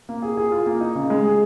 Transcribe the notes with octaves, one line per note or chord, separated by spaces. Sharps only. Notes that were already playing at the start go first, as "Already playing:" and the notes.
A#3
G#4
G#4
F4
A#3
D#4
C#3
G#3
G#4